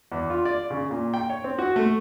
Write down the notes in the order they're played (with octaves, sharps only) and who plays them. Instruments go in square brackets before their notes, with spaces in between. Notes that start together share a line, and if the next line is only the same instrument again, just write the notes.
[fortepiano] E2
F4
D5
C#3
A#2
G5
C#5
C4
F#4
A3